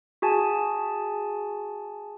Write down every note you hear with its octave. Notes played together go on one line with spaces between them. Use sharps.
F#4 G#4 G#5 A5